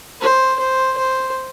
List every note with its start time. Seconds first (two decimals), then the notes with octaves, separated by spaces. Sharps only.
0.21 C5
0.59 C5
0.98 C5